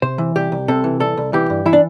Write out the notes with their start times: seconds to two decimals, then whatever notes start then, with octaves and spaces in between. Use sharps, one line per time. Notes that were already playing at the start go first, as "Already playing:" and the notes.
0.02 C3 C5
0.18 E3
0.36 C2 G4
0.52 C2
0.68 C3 A4
0.84 E3
1.00 C2 A4
1.17 C2
1.33 E3 G4
1.50 G2
1.66 E3 E4
1.73 D4